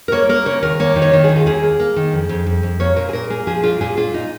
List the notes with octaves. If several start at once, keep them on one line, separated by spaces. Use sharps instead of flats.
A#4
A#3 C#5
A#3 A#4
C#3 C#5
D#2 A#4
A#3 C#5
D#3
C#5
D#3
G#4
D#2
F4
D#2 G#4
A#3
A#3
D#3
F2
F2
F2
F2
A#3 C#5
A#2 A#4
G#4
A#2 A#4
A#3 G#4
F3 G#4
A#2 F4
A#2 G#4
A#2 F4
D#4